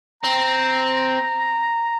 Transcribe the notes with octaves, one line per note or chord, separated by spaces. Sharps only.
C4 A#5